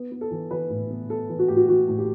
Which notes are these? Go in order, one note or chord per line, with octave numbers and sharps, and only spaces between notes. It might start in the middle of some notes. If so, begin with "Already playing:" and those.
Already playing: B3
B3
A4
E3
E3 B4
A2
B3
B3 A4
E3
F#4
A2 G4
F#4
E3 F#4
A2
G4